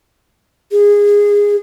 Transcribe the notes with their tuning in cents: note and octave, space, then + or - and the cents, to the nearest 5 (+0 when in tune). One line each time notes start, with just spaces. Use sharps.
G#4 -20